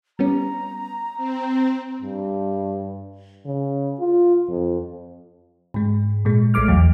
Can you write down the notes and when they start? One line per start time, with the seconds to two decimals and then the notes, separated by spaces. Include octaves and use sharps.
0.19 G3 B3 C#4 A#5
1.17 C4
2.02 G2
3.45 C#3
3.99 F4
4.48 F2
5.74 G#2 G#3
6.25 A#2 G#3
6.54 A#1 G#3 A3 D6 F6
6.68 E2 F#3